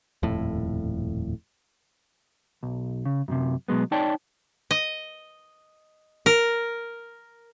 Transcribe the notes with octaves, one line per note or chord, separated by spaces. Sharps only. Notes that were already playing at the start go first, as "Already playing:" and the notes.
D#1 F2 A2
B1
C#3
F#2 A2 C3
B2 F#3 G#3 B3
D#4 C#5 D5 G5 A5
D#5
A#4